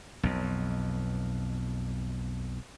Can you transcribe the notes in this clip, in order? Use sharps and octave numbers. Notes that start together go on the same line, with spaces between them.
B1 F2